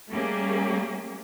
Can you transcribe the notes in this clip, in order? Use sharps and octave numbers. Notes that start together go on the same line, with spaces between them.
G3 A3 A#3 C#4 G4 G#4